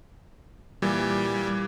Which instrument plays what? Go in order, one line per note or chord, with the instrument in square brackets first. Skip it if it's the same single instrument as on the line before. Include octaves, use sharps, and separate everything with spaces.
[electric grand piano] A#2 E3 [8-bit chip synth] G3